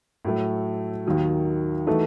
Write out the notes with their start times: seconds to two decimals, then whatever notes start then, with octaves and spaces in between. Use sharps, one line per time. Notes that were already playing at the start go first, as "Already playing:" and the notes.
0.25 A2 F#3 A3
1.07 D#2 D#3 F#3
1.87 E3 A3 D#4 F#4 A4